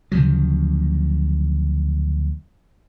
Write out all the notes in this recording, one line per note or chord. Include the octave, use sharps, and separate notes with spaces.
D2 C#3 F3 F#3